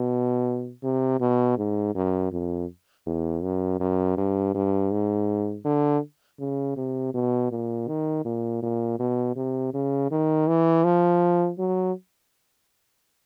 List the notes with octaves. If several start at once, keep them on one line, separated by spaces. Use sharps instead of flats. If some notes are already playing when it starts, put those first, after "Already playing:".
Already playing: B2
C3
B2
G#2
F#2
F2
E2
F#2
F#2
G2
G2
G#2
D3
C#3
C3
B2
A#2
D#3
A#2
A#2
B2
C3
C#3
D#3
E3
F3
F#3